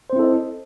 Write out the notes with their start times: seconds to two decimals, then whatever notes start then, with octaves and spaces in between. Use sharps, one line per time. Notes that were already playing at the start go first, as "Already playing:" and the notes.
0.10 C5
0.13 C4
0.16 E4
0.19 A4
0.22 D#5